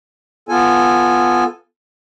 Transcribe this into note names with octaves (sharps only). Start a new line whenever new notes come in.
B3 F4 A4 G#5